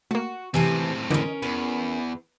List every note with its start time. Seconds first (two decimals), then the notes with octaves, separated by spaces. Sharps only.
0.11 A3 A#3 F#4
0.54 A2 C3 E3 C4 G#5 A5
1.11 D3 E3 C#4 A#4 D#5
1.42 E2 B4